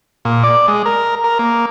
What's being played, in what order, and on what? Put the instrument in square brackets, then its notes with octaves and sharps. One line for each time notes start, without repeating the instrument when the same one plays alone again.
[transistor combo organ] A#2
D5
G#3
A#4
A#4
A#3